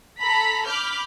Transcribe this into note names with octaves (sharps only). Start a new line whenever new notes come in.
A4 A#5 B5 B6
B5 D6 F6 G6